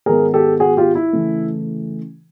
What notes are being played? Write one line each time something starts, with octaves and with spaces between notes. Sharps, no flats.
G#2 D#3 G#3 B3 G#4 A#4
G4 A4
F#4 G#4
F4 G4
E4
C#3 E3 A3